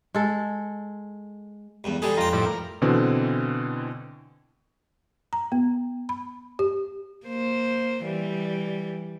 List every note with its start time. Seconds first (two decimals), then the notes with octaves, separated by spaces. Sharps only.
0.14 G#3 A4
1.84 E2 G2
2.02 D3 G3 G#4 A4
2.17 F2 F4 G5 A#5
2.33 A2 F3 G3
2.45 A#4
2.82 B2 D3 E3 C4
5.33 A#5
5.52 B3
6.09 B5
6.59 G4
7.26 A#3 C5
8.04 E3 G3